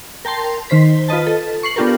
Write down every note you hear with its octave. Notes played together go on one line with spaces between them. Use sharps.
A#4 G5 A5 C6
D#3 C5 B6
F4 B4 D#5 A5
A4
C#6 C7 F#7
B3 D4 F4 G4 A4 A#4